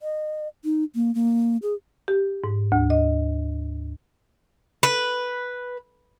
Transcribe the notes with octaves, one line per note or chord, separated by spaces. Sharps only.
D#5
D#4
A#3
A#3
G#4
G4
G#2
D2
D#5
B4